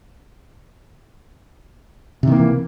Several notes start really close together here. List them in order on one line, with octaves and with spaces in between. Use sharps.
C3 D#3 A#3 E3